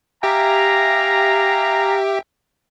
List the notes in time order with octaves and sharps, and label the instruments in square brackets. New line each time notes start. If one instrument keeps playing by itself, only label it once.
[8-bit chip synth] G4 E5 G5 [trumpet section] F5 G#5 A#5